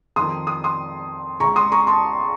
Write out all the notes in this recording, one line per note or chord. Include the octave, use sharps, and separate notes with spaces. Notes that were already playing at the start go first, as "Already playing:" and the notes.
F2 D#3 C6 D#6
D#6
C6 D#6
C#2 C#3 A#5 C#6
C6 D#6
A#5 C#6
A5 C6